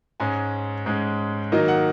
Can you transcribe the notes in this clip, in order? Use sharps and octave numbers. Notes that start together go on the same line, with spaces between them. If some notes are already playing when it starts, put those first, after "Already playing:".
G#2 G#3 C#4 G#5
G#2 G#3 C#4
D#3 F#3 A#3 D#4 D#5
F#5